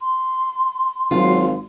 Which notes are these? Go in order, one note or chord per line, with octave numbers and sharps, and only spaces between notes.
C6
G#1 F#3 F4